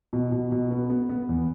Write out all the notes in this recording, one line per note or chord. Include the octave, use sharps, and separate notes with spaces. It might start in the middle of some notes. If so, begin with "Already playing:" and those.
B2
B2
B2
B3
B3
B3
E2